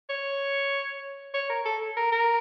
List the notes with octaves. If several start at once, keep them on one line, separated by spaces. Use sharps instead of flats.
C#5
C#5
A#4
A4
A#4
A#4